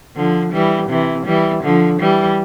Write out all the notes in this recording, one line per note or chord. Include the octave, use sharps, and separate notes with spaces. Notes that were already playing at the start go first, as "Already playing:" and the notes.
D3 F3
E3 G3
C3 E3
E3 G3
D3 F3
E3 G3